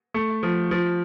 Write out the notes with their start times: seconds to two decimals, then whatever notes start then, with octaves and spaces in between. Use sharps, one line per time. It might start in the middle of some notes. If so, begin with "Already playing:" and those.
0.14 A3
0.43 F3
0.71 F3